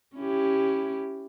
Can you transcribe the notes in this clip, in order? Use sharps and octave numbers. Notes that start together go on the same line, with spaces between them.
C#4 E4 G4